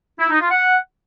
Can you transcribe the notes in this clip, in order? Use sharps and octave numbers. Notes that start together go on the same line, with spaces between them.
E4
D#4
F4
F#5